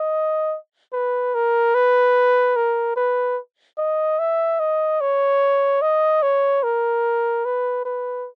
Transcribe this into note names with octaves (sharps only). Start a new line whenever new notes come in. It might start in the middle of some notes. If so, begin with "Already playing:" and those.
Already playing: D#5
B4
A#4
B4
A#4
B4
D#5
E5
D#5
C#5
D#5
C#5
A#4
B4
B4